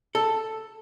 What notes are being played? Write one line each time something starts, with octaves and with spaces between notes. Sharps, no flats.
A4